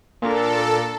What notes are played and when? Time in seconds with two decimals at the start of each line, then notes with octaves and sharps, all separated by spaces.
0.22 A#2 D4 A4 A#4